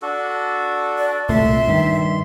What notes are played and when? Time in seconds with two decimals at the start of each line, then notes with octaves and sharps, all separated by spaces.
0.02 D4 F#4 A4
0.98 D5
1.29 C2 A#2 A3 E5 C6
1.67 G2 D#3